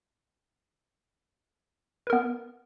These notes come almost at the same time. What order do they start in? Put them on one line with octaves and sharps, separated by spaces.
B4 A#4 B3